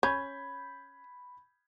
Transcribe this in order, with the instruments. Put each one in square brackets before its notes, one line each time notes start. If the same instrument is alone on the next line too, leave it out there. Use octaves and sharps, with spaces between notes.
[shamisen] C#4 [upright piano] B5 G6 G#6